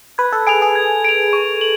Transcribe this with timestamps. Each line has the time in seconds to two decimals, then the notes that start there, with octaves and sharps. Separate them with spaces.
0.18 B4 G#6
0.32 A4
0.47 G#4 D7 F7
0.62 G#4
0.75 G#6
1.04 D7 F7
1.33 C#6
1.61 F#7